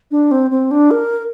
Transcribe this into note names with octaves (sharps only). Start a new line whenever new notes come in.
D4
C4
C4
D4
A#4